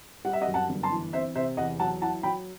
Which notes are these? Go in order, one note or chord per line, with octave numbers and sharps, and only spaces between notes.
G3 F#5
E5
D#5 F#5
F#2
F#5 A5
G1
A5 C6
E3
C4 C5 E5
C3 C5 E5
E2 D#5 F#5
F#3 F#5 A5
E4 F#5 A5
F#3 G5 B5